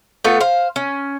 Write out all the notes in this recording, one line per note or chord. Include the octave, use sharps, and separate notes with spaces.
A3 B3 F4 A4
C5 F5
C#4